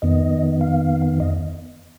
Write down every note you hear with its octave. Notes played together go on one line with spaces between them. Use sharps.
F2 D#3 B3 D#5
F5
D#5